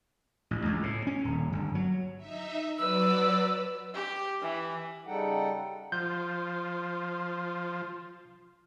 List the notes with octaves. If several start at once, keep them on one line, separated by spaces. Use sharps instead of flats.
A1
C#2
A2
C#4
D#1
G1
F#3
D#4 E5
F#3 B4 D5 E6
G4
E3
C#3 G3 D#4 A4 F#5 G5
F3 G6